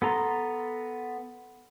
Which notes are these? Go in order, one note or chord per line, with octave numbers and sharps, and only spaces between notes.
B3 A4 A#5 C6